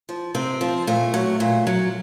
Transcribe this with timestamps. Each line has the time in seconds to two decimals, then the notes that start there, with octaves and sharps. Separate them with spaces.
0.09 F3
0.34 C3 C4
0.61 F3
0.87 A#2 A3
1.14 F#3
1.40 A#2
1.67 F#3